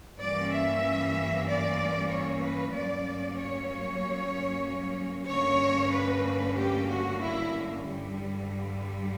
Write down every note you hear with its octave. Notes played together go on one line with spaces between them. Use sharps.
G2 E3 A#3 C#4 D5
E5
D5
C#5
B4
G2 F#3 A#3 C#4 D5
C#5
G2 D3 A#3 C#4 C#5
B4
G4
F#4
E4
G2 D3 G3